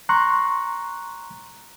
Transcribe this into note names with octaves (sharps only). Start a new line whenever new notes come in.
A#5 C6 C#6 F#6